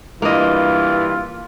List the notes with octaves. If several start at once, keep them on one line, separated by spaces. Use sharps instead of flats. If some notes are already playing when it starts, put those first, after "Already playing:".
G2 E3 A#3 F4 D#5